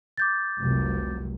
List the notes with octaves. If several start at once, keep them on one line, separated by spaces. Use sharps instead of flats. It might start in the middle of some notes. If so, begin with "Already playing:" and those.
D6 G6 A6
F1 C2 F#3